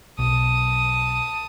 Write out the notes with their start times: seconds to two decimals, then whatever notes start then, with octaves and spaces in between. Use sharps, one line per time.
0.19 B1 A5 D#6